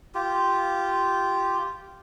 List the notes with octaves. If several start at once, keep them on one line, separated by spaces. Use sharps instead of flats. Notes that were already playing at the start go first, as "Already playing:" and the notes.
F4 G4